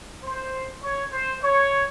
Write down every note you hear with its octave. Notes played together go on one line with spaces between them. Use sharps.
C5
C#5
C5
C#5